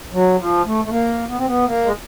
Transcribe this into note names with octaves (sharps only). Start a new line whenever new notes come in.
F#3
F3
A3
A3
A#3
B3
C4
B3
A#3
G#3